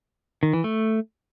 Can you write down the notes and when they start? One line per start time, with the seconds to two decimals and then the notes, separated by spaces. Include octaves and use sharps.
0.43 D#3
0.53 E3
0.64 A3